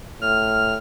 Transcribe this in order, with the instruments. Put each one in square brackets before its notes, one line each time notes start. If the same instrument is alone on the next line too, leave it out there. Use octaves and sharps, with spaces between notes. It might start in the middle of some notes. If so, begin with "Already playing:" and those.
[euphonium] A2 [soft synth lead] F6